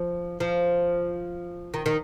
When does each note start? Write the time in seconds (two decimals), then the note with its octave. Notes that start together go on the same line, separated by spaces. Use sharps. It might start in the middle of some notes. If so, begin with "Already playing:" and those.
Already playing: F3
0.40 F3
1.74 D#3
1.86 D#3